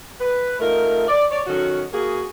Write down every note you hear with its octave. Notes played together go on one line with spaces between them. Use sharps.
B4
A3 D#4 F4 A#4
D5
C#5 D5
D#3 F#3 C#4 F#4 A4
A#3 F#4 G#4